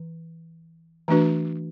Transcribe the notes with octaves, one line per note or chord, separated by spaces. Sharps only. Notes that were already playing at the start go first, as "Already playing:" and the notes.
Already playing: E3
E3 A3 D4 F#4 B4